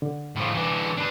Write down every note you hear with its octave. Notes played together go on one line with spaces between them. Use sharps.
D3
A2 F3
E3 D4
D4 B4